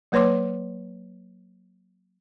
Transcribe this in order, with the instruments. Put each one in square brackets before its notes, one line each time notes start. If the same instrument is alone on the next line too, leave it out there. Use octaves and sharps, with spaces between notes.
[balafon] F#3 A#3 B4 C#5 C6 D6